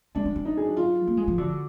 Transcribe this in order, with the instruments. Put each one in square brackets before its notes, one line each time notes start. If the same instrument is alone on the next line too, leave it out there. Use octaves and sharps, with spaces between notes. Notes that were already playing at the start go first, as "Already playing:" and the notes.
[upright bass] G#3 [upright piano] D4
[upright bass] F#3
F#3
[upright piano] D#4
G#4
F#4
F4
[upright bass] A#3
G#3
F3
[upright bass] D3 [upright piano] F#4